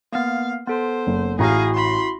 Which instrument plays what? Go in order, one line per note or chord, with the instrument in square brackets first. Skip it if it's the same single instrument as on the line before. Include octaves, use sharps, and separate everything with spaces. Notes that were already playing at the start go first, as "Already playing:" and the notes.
[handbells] A#3 B3 [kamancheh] F5
[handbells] B3 A4 [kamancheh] C5
[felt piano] F#1
[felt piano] A1 A#5 A#6 [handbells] E4 F#4 [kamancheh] G#4 F5
[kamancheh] B5 C6